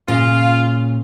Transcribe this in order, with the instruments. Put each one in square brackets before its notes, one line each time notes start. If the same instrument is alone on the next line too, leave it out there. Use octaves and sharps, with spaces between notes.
[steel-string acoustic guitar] A#2 C#3 [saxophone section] F4